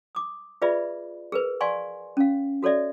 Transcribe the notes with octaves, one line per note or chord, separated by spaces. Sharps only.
D6 D#6
F4 G#4 B4 D5 E5 B5
G#4 A#4 B4
D5 F5 G#5 C6 C#6
C#4 F5
F#4 A4 C#5 D5 E5